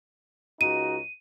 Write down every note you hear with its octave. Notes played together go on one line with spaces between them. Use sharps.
C#2 D#4 F#4 D#7